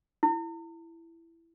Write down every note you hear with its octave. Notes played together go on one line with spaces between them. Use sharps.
E4